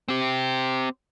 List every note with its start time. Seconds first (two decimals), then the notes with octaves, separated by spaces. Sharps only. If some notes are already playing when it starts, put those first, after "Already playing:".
0.08 C4 G4